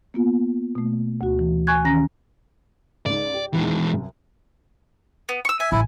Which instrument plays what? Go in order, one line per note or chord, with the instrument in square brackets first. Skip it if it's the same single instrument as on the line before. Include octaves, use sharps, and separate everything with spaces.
[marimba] A#3 B3 F4
B2 A3
D2 F#4
E3
G#5 C#6 F#6 G#6
D#3 C#4 A#5 A#6
[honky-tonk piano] C#2 G#2 [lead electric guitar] D5
[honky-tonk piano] G4
[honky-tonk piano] E2 A#2 D#3 [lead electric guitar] E3 G#3
[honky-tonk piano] C2 F#2
[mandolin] B3
C#6 E6
[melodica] E5 [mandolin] G#5
[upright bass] A1 [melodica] E4